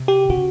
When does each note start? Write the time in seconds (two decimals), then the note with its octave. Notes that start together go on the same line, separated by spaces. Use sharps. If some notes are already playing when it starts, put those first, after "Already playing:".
Already playing: C3
0.08 G4
0.30 C#3 F#4